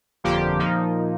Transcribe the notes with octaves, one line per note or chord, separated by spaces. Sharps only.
G1 F2 D3 F3 A#3 G4
A#2 F3 A#3 D#4